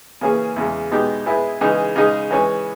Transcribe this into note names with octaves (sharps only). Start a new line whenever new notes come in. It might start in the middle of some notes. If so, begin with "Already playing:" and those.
C#3 E3 A#3 C#4 G#4
E2 C#3 G#3
B2 G#3 D#4 G4
G#3 B3 E4 G#4
C#3 E3 G#3 D#4 G#4
C#3 G#3 D#4 G#4
E3 G#3 C#4 G#4